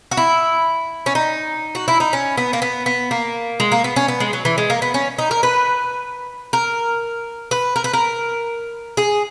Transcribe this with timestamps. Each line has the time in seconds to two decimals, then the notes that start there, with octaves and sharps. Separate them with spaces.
0.11 F#4
0.17 E4
1.06 C#4
1.15 D#4
1.75 F#4
1.88 E4
2.00 D#4
2.13 C#4
2.38 B3
2.53 A#3
2.62 B3
2.86 B3
3.11 A#3
3.60 G#3
3.72 A#3
3.84 B3
3.96 C#4
4.08 B3
4.20 G#3
4.33 F#3
4.45 E3
4.58 G#3
4.70 A#3
4.82 B3
4.94 C#4
5.18 D#4
5.31 A#4
5.43 B4
6.53 A#4
7.51 B4
7.76 A#4
7.84 B4
7.94 A#4
8.97 G#4